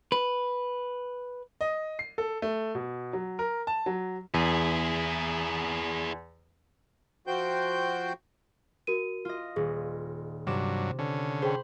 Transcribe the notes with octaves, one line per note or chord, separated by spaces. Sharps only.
B4
D#5
C7
A4
A3
B2
F#3
A#4
A5
F#3
E2 E4 G#4
F3 F#4 C5 G5 G6
F#4 A#4 D#7
F4 D#5
D#1 G#4
G2 C3 F#3 D6 E7
D3 C#4
G#4 C5 G5 B5